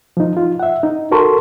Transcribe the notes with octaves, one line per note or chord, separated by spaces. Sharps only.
F3 D#4
F4
E5 F#5
D#4
F#4 A4 A#4 A5 C6 C#6